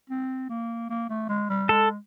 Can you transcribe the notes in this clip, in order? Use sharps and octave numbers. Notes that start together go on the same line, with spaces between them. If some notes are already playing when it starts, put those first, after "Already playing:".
C4
A#3
A#3
A3
G#3
G3
G#3 A4